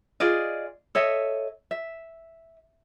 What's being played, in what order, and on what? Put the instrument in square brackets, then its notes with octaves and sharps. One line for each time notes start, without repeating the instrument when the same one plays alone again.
[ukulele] F4 G#4 D5 D#5
A4 C#5 D#5 E5
E5